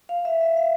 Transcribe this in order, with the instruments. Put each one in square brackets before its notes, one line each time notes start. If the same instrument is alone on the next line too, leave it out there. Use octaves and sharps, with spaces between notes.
[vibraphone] F5
E5
E5
F5